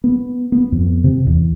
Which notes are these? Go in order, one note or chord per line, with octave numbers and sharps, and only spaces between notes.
B3
B3
F2
C3
E2